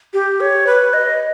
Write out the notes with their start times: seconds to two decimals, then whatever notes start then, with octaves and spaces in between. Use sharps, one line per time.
0.13 G4
0.40 C#5
0.67 B4
0.93 D#5